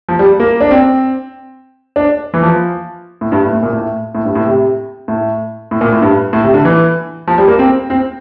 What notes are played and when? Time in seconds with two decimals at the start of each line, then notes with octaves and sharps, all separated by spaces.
0.09 F3
0.19 G3
0.40 A#3
0.61 D4
0.71 C4
1.96 D4
2.34 E3
2.43 F3
3.21 A2
3.32 G2
3.43 A2
3.53 A2
3.63 A#2
3.73 A2
4.15 A2
4.25 G2
4.35 A2
4.46 C3
5.08 A2
5.71 A2
5.81 A#2
5.92 A2
6.02 G2
6.33 A2
6.44 C3
6.54 D3
6.65 E3
7.28 F3
7.38 G3
7.48 A#3
7.59 C4
7.90 C4